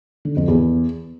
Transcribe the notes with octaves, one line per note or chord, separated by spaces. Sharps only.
D3
F2
E2